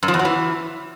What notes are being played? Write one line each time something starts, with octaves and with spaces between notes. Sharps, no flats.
F#2
F3
E2
F#3
E3